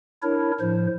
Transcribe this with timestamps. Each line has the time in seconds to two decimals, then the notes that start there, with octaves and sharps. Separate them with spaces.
0.23 D4 E4 A#4 C#5
0.60 A2 F3 C5